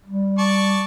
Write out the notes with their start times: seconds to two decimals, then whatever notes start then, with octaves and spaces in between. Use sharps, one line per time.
0.06 G3
0.38 D5 A5 C#6